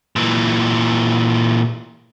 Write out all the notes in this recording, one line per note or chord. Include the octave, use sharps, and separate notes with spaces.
A#2 E3